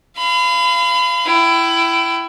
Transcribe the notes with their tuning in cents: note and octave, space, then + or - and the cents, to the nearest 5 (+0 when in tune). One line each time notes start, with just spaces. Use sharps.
F5 -30 B5 +25
E4 +20 G5 -30